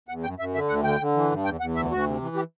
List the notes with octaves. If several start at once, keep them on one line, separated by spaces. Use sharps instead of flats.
E2 F#5
F#2 G5
F#2 E5
D3 E5
D2 F#5
D3 G5
D3
E3
G2
E2 G5
E2 F#5
D2 E5
D2 F#4
C3
E3
G4